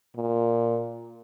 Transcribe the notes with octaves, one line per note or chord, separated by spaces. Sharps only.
A#2